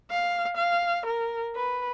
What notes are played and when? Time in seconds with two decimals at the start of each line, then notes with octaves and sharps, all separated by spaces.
0.10 F5
0.57 F5
1.07 A#4
1.55 B4